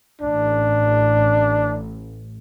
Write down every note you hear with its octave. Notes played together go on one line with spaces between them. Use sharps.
A1 D4